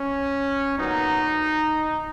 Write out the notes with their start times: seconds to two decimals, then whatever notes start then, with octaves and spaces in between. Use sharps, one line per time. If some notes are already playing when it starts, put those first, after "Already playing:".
Already playing: C#4
0.79 A#2 F#3 B3 D#4